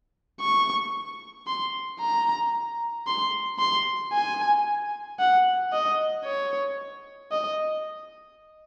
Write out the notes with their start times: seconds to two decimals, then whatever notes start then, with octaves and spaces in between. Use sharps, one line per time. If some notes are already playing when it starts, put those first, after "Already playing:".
0.41 C#6
1.47 C6
2.01 A#5
3.07 C6
3.59 C6
4.13 G#5
5.20 F#5
5.73 D#5
6.25 C#5
7.32 D#5